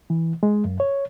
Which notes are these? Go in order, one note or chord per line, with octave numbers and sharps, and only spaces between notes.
E3
G#3
F#2
C#5